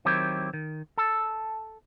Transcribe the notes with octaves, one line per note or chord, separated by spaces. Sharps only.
D#3 F#3 C4 E4 G4
D#3
A4